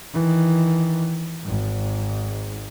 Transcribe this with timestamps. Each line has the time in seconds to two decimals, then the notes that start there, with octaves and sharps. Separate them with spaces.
0.13 D#3 E3
1.45 G#1 G#2